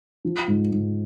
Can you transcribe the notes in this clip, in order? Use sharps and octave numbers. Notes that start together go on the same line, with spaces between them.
F3
G#2
G#2